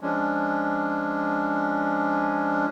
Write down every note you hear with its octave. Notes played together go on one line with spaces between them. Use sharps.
F3 G#3 C#4 D4